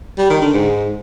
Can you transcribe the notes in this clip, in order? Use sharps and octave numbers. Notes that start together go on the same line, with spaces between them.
G3
D#3
D3
G#2